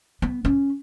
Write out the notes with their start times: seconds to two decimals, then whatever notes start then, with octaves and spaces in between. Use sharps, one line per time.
0.22 B3
0.45 C#4